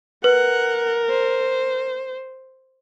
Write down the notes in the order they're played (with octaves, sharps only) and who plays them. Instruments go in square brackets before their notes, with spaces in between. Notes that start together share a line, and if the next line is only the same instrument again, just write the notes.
[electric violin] A#4 [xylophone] B4 [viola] F#5
[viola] C5